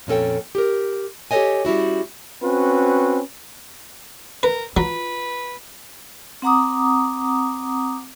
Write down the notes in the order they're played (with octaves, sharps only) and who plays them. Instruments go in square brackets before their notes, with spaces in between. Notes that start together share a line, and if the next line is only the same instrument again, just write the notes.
[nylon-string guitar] F2 A#2 C#4 A4 G5
G4 A#4
G4 A4 C5 C#5 D#5 G#5
G3 C#4 E4 F#4
[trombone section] C4 C#4 F#4 B4
[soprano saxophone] A#4 [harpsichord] B4
[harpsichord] F#3 [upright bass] F4 [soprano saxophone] B4
[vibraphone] C4 F#5 A#5 D6 D#6